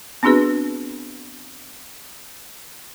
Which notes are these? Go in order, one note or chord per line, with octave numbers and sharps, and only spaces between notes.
B3 C4 D4 F#4 G#4 B4